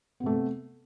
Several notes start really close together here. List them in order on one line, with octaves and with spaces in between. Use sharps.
B3 C3 A3